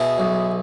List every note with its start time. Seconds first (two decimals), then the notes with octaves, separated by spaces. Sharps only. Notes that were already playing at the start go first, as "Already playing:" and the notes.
Already playing: B2 E4 G#4
0.18 B1